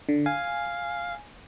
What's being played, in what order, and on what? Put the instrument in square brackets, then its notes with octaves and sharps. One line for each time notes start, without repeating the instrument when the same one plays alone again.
[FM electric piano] D3
[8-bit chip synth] F5 [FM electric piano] G#5